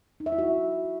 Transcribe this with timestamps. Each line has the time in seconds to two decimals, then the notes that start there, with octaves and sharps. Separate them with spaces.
0.20 D#4
0.26 E5
0.32 E4
0.38 F#4